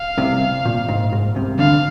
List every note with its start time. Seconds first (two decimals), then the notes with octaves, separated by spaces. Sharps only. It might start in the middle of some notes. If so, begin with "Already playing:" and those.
Already playing: F5
0.17 C2 C3
0.65 A#2
0.88 G#2
1.13 G#2
1.35 C2 C3
1.59 D2 D3 F5